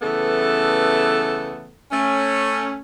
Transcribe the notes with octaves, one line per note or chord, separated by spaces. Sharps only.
C#3 E3 A3 B3 A4
A3 C#4